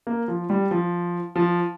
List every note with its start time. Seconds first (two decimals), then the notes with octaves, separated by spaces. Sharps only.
0.07 A#3
0.28 F3
0.50 G3
0.71 F3
1.36 F3